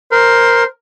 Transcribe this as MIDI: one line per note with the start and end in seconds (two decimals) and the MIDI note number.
0.12 0.64 70
0.12 0.65 72